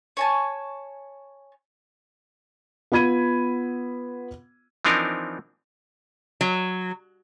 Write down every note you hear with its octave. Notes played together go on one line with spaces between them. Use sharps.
C#5 G#5 A5
B3 F4 B5 G#6 D#7
E3 F3 C4 D4 D#4 A#4
F#3